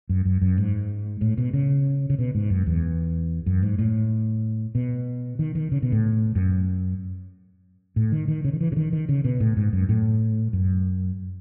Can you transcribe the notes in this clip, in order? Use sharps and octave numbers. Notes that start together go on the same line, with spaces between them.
F#2
F#2
F#2
G#2
A2
B2
C#3
C#3
B2
G#2
F#2
E2
F#2
G#2
A2
B2
D#3
D#3
C#3
B2
A2
F#2
A2
D#3
D#3
C#3
D#3
E3
C#3
D#3
D#3
C#3
B2
A2
G#2
F#2
A2
F#2